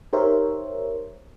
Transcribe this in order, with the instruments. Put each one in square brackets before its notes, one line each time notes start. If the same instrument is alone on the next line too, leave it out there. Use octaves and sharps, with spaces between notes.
[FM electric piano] D#4 G4 A#4 C5 C#5 E5